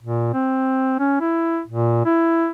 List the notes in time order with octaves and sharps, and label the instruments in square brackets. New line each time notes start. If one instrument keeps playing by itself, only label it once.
[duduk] A#2
C4
C#4
E4
A#2
E4